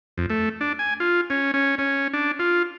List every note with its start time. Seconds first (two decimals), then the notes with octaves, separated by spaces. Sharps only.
0.18 F2
0.30 A3
0.61 D4
0.79 G#5
1.00 F4
1.30 C#4
1.54 C#4
1.78 C#4
2.14 D4
2.39 F4